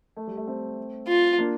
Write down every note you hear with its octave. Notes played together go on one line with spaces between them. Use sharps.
A3
G3
A3
A3 C4
F4
A#3 D4